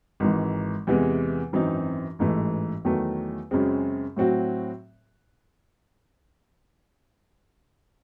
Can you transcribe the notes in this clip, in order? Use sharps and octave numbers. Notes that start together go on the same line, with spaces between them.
G#1 G#2 E3
E2 C3 E3 G#3
G#1 F#2 E3 C4 D#4
A1 G#2 E3 A3
E2 D#3 F#3 A3
F#2 C#3 G#3 C4
A2 F#3 C4 F#4